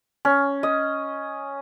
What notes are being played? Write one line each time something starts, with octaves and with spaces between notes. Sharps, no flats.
C#4
D#5